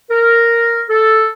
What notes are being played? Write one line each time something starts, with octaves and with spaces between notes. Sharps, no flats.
A#4
A4